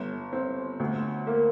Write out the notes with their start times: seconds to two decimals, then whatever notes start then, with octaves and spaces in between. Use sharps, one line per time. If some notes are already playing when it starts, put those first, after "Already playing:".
Already playing: G1
0.33 C4
0.80 D2
1.27 A#3